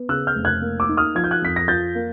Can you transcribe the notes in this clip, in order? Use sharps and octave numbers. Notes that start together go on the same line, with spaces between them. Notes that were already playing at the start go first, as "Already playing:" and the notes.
Already playing: B3
C#3 E6 F#6
F6 G6
F1
F#6 G#6
A#3
D6 E6
D#4
D#6 F6
F3 G#6
G6
F#6 G#6
F2 B6
A#6
F3 G6 A6
A#3